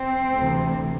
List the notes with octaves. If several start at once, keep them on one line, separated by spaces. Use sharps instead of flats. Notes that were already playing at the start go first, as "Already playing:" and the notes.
Already playing: C4
D2 C3 E3